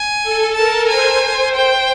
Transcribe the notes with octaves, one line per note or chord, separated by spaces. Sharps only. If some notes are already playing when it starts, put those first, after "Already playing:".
Already playing: G#5
A4
A#4 A5
C5 G#5
G5